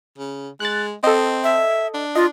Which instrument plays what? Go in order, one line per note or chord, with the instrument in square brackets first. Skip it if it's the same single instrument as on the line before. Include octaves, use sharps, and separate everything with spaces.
[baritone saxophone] C#3
[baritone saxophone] G#3 [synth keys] F#6 A6
[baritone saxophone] C4 [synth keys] A4 D#5
[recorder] E5
[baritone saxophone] D4
[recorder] F4 [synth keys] D#5